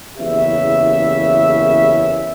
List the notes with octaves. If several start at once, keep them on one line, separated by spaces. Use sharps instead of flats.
F#1 E2 C#3 G4 E5